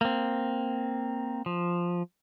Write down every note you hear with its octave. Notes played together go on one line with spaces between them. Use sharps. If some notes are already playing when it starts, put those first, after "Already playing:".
A#3 C4
F3